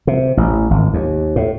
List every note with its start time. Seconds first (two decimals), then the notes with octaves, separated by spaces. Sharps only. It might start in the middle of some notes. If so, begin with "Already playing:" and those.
0.07 C3
0.37 A1
0.71 G#1
0.94 D#2
1.36 A2